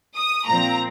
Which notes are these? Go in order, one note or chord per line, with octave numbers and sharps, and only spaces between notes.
D#6
A#2 F3 C4 A#5